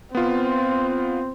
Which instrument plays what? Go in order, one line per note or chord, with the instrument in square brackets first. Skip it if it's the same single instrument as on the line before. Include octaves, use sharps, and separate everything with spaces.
[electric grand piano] B3 F4 [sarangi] C4